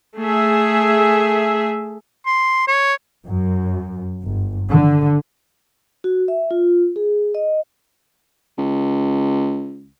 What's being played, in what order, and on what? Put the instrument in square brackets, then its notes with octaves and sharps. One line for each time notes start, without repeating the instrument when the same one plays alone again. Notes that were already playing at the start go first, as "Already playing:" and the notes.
[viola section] A3 G#4 E5
[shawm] C6
C#5
[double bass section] F#2
G1
D3
[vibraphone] F#4
E5
F4
G#4
D#5
[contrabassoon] C#2